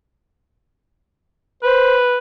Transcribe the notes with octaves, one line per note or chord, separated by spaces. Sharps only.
B4 C5